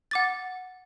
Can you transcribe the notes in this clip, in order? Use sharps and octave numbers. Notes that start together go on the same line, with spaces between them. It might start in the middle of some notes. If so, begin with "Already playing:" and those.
F#5 D6 A6